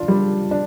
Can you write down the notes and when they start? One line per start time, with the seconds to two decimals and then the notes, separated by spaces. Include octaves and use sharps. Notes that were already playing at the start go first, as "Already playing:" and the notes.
Already playing: D4 F4
0.08 G3
0.51 D4